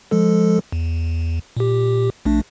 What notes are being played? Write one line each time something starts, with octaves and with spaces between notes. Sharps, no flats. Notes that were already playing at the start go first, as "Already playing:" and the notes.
F3 G#3 A4
E2
A#2 G4
A#1 A3 D4